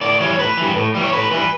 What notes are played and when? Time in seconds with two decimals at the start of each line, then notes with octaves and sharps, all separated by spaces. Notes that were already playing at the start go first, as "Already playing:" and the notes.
0.01 A2 D5
0.20 E3 G3 C#5
0.39 A2 B4
0.57 E3 G3
0.75 A2
0.95 E3 G3
1.02 C#5
1.13 A2 B4
1.31 E3 G3 B4